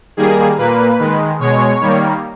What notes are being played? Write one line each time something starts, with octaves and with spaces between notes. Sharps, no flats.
D#3 G3 A#3 G#4
A#2 A#3 B4
D#3 G#3
B2 G#3 C#5
D#3 G3 A#3